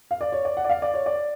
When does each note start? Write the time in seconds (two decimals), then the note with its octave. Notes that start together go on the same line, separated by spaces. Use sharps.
0.11 F5
0.21 D5
0.32 C#5
0.45 D5
0.57 F#5
0.64 D5
0.69 F5
0.82 D5
0.94 C#5
1.06 D5